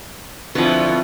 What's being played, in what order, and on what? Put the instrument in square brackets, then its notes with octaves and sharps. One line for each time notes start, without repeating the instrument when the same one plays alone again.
[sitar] B2 D3 B3 [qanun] F3 B4 [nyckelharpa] C4 E4